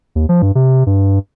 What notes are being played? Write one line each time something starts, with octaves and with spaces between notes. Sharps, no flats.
D#2
F3
G2
C3
G2